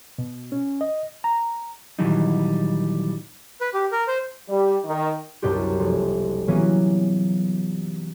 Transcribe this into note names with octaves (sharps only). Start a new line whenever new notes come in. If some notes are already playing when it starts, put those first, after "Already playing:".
B2
C#4
D#5
A#5
A#2 D#3 E3 F#3 G3 D#4
B4
G4
A#4
C5
G3
D#3
C2 F#2 B2 D4 G4
F1
E3 F#3 A#3 B3 C#4